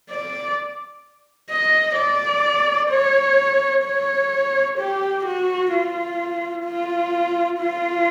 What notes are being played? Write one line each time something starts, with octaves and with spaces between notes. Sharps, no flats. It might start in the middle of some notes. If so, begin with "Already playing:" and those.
D5
D#5
D5
C#5
C#5
G4
F#4
F4
F4
F4